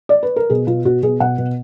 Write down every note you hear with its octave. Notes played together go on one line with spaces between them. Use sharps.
D5
B4
A#4
B2 G#4
B2 F4
B2 F#4
B2 G#4
B2 F#5
B2